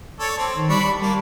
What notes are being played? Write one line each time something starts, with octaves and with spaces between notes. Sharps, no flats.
A4 C#5 D5
C4
D#3
G3 D4 B5 C#6
A#3 A5